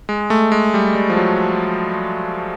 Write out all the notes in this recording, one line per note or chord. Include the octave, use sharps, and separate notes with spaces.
G#3
A3
G#3
G3
G3
F3
F#3